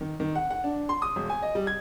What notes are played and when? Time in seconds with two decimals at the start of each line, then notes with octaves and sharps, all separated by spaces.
0.01 D#3
0.20 D#3
0.35 F#5
0.51 F#5
0.64 D4
0.89 C6
1.02 D#6
1.16 E1
1.30 G#5
1.42 D#5
1.55 G3
1.67 G#6